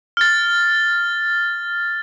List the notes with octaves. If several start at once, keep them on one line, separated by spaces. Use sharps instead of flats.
F6 A6